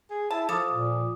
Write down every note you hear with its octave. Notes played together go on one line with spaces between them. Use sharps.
G#4
E4 A5
F3 A4 D6 D#6
A#2